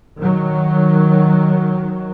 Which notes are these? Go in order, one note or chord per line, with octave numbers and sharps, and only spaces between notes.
D#3 F#3